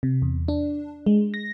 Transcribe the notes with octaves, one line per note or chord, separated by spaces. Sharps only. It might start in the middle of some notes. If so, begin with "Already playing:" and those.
C3
E2
D4
G#3
A#6